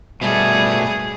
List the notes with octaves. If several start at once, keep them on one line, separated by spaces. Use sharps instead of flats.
B2 G3 A3 G#4